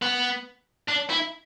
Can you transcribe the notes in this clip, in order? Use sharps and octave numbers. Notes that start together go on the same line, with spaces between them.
B3
D4
E4